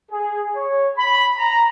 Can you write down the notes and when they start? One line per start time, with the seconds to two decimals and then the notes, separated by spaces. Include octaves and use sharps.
0.11 G#4
0.56 C#5
0.97 B5
1.37 A#5